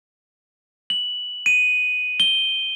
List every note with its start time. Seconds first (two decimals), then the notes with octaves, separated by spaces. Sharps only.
0.90 F#7
1.46 D#7
2.20 G7